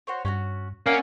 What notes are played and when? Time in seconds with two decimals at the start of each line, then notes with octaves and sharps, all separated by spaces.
0.07 F#4 C5 C#5
0.25 G2 C#4 E4 F#4
0.86 A#3 C#4 D5 E5 F#5